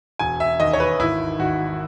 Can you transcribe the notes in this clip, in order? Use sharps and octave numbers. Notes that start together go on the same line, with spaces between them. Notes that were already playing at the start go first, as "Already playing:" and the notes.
E1 G#5
E5
D#2 D#5
C#5
B4
G#1 E4
G#1 F#4